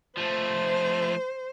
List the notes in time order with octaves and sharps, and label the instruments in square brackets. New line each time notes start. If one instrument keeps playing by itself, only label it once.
[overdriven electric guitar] F3 A3 [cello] C5